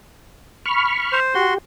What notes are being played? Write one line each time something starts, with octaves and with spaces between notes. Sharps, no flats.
B5 C#6 F6
C5
F#4 G4 C6